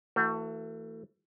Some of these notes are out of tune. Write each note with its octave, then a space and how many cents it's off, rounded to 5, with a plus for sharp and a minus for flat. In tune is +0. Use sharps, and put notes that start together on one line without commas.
E3 -10 A3 +30 F#4 +0